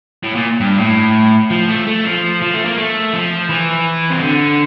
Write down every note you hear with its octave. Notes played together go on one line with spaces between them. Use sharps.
A2
A#2
G2
A2
F3
A3
A3
F3
F3
A3
A#3
A3
F3
E3
C3
D3